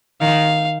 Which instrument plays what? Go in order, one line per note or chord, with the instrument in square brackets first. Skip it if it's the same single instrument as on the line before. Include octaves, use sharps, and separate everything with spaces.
[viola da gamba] D#3 [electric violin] F5